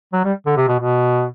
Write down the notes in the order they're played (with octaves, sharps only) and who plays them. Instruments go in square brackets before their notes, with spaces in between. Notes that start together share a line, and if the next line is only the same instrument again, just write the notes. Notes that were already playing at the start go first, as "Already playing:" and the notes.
[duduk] F#3
G3
D3
C3
B2
B2